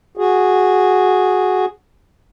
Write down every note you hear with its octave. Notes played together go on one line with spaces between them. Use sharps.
F#4 G#4